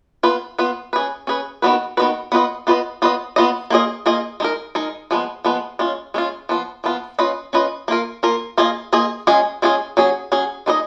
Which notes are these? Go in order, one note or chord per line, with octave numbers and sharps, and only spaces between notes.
B3 F4 B4
B3 F4 B4
C#4 G#4 B4
C#4 G#4 B4
D#3 G#3 B3 F#4 B4
D#3 G#3 B3 F#4 B4
B3 F4 B4 D#5
B3 F4 B4 D#5
B3 F4 B4 D#5
B3 F4 B4 D#5
A#3 F4 G#4 D#5
A#3 F4 G#4 D#5
G#3 D#4 A#4
G#3 D#4 A#4
F3 G#3 B3
F3 G#3 B3
G#3 C#4 F4
G#3 C#4 F4
F3 B3 F4
F3 B3 F4
C#4 F4 B4 D#5
C#4 F4 B4 D#5
A#3 F4 A#4
A#3 F4 A#4
A#3 F4 G#4 D#5
A#3 F4 G#4 D#5
G#3 C#4 F4 G#4
G#3 C#4 F4 G#4
F#3 C#4 G#4
F#3 C#4 G#4
G#3 D#4 G#4 B4 D#5